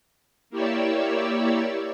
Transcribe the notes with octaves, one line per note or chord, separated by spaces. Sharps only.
A#3 E4 G4 C#5 D5 E6